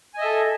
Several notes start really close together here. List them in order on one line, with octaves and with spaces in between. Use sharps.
G#5 D#5 E5 A4